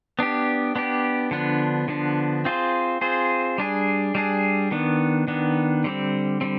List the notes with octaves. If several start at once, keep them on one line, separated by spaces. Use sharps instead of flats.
B3 D4 G4
B3 D4 G4
D3 F3 B3 D4
D3 F3 B3 D4
C4 F4 G#4 C5
C4 F4 G#4 C5
G3 D4 G#4
G3 D4 G#4
D#3 B3 D4
D#3 B3 D4
D3 G3 C4
D3 G3 C4